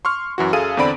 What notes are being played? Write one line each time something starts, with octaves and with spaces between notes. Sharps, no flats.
C6 C#6 F6
F#2 E3 F#4
F#2 G#4 A4 F5 D#7
E2 D3 C4 D5 B5 D7